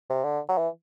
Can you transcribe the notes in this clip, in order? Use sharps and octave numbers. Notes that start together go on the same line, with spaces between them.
C3
D3
F#3
E3